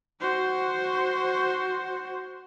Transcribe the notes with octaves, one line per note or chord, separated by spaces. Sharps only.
F#4 C5